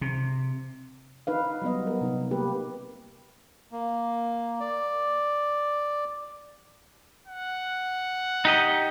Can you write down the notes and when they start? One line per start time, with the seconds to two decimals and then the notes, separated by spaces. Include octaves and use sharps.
0.01 C3
1.27 D#4 B4 F5
1.62 F#3 G3 B3 D#5
1.87 A#4
2.01 C3 D#4
2.31 A#3 G4 B4
3.72 A#3
4.60 D5
7.27 F#5
8.45 D#4 G4 D#5